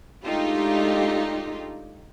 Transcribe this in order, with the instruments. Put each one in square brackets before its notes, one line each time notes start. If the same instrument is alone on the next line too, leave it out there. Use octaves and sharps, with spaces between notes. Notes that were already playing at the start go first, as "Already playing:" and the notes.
[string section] G#3 A3 D4 D#4 F4 G4